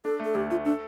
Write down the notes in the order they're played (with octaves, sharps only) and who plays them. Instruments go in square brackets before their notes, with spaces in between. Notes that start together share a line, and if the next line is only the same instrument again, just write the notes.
[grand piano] D4 [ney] A4
[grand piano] A3 [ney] A4
[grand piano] D2 [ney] G4
[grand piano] A3 [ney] F4
[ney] D4 [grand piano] A4